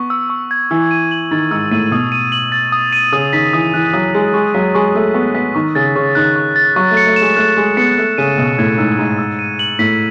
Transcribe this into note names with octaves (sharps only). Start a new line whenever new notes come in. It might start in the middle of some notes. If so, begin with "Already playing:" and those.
Already playing: B3 C#6
E6
C#6
G#6
E3 E6
D#7
F#7
D#3 A6
G#2 E6
A2 D#7
B2 D#6
D#7
F#7
A6
D#6
D#7
C#3 D#6
D#3 B6
E3 D#6
E3 F#6
F#3 D#6
G#3 B6
G#3 C#6
F#3 B6
G#3 C#6
A3 E6
B3 C#6
B3 B6
D#3 C#6
C#3 A6
C#3 C#6
D#3 F#6
C#6
A6
F#3 C#6
A3
C#7
A3
G#3 E7
A3 F#6
G#3 C#6
B3 C#7
A3 E6
C#3 D#7
B2 E6
A2 G#6
G#2 E6
G#2 D#7
E6
D#7
F#7
A2 B6